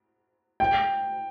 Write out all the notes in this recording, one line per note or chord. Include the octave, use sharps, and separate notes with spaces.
G5